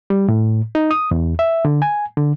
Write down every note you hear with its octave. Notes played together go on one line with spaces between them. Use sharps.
G3
A2
D#4
D#6
E2
E5
D3
G#5
D3